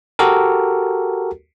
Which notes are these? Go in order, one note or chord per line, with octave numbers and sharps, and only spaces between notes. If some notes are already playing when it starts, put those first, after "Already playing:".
F#4 G4 A4 A#4